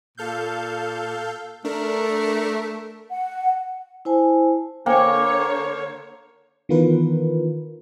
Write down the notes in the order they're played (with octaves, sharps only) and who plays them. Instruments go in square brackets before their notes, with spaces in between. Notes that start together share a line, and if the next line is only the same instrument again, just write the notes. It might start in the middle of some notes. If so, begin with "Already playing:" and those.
[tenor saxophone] A#2 [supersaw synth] A4 F5 G6
[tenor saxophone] A3 [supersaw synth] D4 A#4
[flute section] F#5
[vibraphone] E4 C5 G#5 A5
[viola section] D3 C#5 [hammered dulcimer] A#3 [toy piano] C5 G5 G#5
[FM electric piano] D#3 E3 B3 F4 A#4 B4